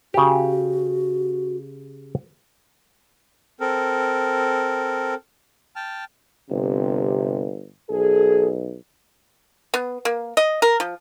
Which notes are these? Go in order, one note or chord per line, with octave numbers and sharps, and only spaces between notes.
C#3 F#4 G4
C4 A4 A#4
G5 A5 F6
G1 C3
B1 G#4 A4
B3
A#3
D#5
A#4
F3